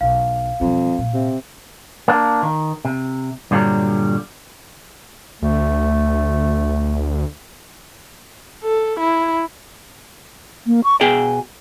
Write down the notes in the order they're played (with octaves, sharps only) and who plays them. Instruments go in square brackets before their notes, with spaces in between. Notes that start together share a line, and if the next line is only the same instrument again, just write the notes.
[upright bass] B1 [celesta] F5
[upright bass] E1 G3 [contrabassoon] F2
[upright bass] A#2
[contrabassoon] C3
[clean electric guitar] A#3 D4
D#3
C3
G2 A#2 D3 E3 F#3 G3
[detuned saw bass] D2 [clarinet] A3
[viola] A4
E4
[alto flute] A#3
C#6
[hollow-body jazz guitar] B2 G#4 G5 [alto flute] G#5